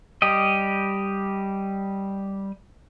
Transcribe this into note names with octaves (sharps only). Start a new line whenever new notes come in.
G3 G4 D#5